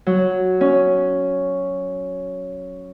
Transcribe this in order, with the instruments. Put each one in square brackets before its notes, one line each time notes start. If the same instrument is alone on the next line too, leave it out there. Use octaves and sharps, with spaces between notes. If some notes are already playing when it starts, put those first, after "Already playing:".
[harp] F#3
C#4